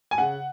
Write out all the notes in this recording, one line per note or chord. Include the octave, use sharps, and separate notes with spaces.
G#5
C#3 F#5